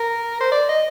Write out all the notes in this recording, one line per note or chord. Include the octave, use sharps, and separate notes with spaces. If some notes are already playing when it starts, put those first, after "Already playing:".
Already playing: A#4
C5
D5
D#5